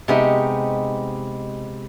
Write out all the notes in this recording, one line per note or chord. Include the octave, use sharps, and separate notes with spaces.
C3 G#3 B3 D#4 G4